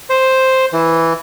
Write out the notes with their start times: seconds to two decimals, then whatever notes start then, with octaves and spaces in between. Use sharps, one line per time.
0.10 C5
0.73 E3